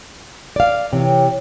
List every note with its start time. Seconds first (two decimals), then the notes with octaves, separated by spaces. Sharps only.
0.56 D5 F5
0.93 C3 E3 C#5 G5